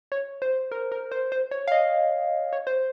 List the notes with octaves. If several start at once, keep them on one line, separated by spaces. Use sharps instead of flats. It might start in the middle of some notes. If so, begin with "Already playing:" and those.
C#5
C5
A#4
A#4
C5
C5
C#5
F5
D#5
C#5
C5